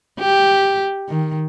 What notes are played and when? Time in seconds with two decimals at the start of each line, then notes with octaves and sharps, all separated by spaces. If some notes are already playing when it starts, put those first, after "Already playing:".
0.19 G4
1.09 D#3